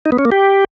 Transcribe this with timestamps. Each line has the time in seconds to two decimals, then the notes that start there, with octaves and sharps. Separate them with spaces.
0.06 D#4
0.12 B3
0.19 C#4
0.25 A#3
0.32 G4